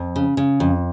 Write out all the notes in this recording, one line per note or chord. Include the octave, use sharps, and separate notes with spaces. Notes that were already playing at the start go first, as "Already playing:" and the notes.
Already playing: F2
C#3
C#3
F2